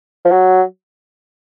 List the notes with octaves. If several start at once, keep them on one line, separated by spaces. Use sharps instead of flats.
F3
F#3